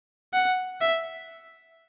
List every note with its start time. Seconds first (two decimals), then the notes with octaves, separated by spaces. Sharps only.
0.33 F#5
0.81 E5